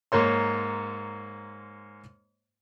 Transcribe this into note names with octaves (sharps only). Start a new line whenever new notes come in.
G#2 A#3 C#5 C6